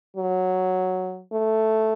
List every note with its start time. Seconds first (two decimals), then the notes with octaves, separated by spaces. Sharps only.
0.17 F#3
1.33 A3